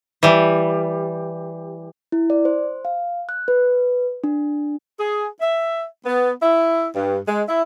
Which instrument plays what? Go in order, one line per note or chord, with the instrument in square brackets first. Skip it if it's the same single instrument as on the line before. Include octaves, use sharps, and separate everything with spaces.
[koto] E3 G3
[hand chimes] E4
D5
C5
F5
F#6
B4
D4
[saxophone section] G#4
E5
B3
E4
G2
G#3
E4